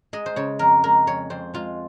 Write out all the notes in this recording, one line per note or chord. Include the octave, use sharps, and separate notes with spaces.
G#3 D#5
C5
C#3 C#5
F2 A#4
G#3 A#4
F2 C#5
F2 C5
G#3 F4